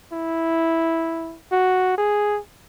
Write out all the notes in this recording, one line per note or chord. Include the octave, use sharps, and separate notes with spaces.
E4
F#4
G#4